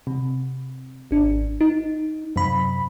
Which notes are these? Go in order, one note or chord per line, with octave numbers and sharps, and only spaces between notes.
C3
G#1 D4
D#4
F#2 C3 B5